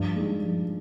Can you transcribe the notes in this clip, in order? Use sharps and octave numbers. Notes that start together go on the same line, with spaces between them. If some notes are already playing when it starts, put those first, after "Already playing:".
Already playing: G2 F3
G#3 D#4
F3